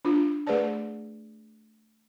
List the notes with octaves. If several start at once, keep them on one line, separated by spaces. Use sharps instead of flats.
D4 F4
A3 G#4 B4 C5 D5 A5